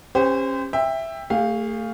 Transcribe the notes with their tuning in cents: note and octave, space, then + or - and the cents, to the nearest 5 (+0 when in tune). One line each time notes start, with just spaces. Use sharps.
C#4 -25 G4 +35 C5 -25
E5 +0 G5 +20
A3 +25 G#4 -35 F5 +0